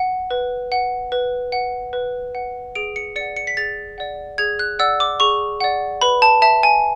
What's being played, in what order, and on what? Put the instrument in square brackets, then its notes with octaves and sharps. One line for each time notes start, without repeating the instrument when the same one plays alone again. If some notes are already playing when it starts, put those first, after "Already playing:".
Already playing: [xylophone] F#5
B4
F#5
B4
F#5
B4
F#5
G#4 D7
C#7
D5 C#7
F#5
C#7
B6
G#4 A6
D5 F#5
G#4 G#6
F#6
D5 F#5 E6
D6
G#4 C#6
D5 F#5
B4 B5
A5
E5 A5
G#5